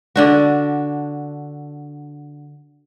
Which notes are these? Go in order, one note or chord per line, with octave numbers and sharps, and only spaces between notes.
D3 D4 F#4